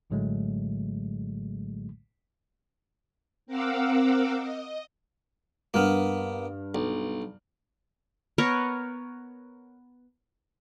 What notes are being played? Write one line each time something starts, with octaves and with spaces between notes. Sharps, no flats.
A#1 A2 D3 F#3 G#3 A3
C4 A#4 F5 F#5 D6 E6
D#5
G2 A#3 B3 F6
B1
B3 A#4 C#5